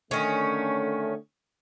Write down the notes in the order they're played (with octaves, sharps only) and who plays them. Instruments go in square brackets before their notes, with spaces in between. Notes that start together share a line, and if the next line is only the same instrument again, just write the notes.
[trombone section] D3 A3 [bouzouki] D#3 C#4